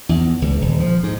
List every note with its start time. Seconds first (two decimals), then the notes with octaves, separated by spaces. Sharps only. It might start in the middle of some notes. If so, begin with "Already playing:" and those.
0.09 E2
0.42 C#2
0.61 D#1
0.80 F3
1.03 G#2